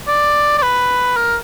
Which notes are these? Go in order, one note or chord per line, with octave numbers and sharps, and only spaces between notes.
D5
D5
B4
A#4